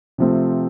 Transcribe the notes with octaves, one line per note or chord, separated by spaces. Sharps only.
C3 F3 A3 C4